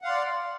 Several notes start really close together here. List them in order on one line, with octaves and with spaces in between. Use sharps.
F#5 F5 C6 D5